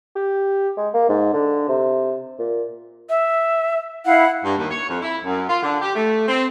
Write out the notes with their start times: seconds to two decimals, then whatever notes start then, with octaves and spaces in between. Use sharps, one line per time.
0.16 G4
0.77 G#3
0.94 A#3
1.09 G#2
1.33 D3
1.69 C3
2.39 A#2
3.09 E5
4.05 E4 F5 F#5
4.45 G2
4.58 D#2
4.71 C#5
4.89 F2
5.02 E4
5.25 F#2
5.49 F4
5.63 D3
5.82 G4
5.95 A3
6.28 C4